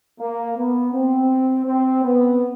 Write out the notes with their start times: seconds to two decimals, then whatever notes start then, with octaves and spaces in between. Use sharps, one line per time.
0.20 A#3
0.57 B3
0.93 C4
1.65 C4
2.03 B3